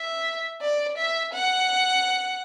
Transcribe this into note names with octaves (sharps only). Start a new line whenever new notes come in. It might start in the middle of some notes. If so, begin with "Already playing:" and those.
Already playing: E5
D5
E5
F#5